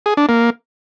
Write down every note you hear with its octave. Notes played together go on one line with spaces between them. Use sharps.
G#4
D4
A#3